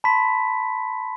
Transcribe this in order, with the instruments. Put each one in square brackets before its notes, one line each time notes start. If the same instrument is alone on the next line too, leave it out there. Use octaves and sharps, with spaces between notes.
[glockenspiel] A5 B5 C6 B6